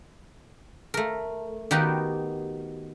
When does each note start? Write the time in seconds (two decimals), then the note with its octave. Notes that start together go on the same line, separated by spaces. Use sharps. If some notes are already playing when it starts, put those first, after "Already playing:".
0.94 A3 A#4
1.71 D#3 B3 D#4 F#4 G4